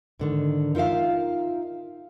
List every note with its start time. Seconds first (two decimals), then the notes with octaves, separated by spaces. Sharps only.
0.19 G#2 D3 D#3
0.75 D#4 F4 A#4 E5 F5